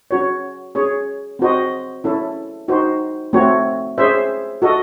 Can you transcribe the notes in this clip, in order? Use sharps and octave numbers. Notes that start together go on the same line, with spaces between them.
C#4 F#4 C#5
C#4 G#4 C#5
C4 F#4 C5 D#5
C#4 E4 A4
D#4 F#4 C5
A3 C4 F#4 C#5
C#4 G#4 C5 E5
F#4 A4 D#5